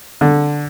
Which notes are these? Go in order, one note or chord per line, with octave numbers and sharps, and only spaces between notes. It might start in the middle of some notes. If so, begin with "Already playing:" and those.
D3